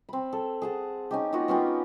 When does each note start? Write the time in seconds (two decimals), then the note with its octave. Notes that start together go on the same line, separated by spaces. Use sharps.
0.09 C4 B5
0.33 A4
0.62 G#4 F#5 A5
1.11 C#4 D#4 G4
1.33 A#3 D#4 F4 F#4
1.48 B3 C#4 F4 G4